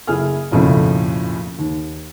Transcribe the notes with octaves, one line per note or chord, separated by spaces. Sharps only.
F#1 E4 G#4 G#5 F6
F#1 B1 F2 A2 C#3 F3
D#2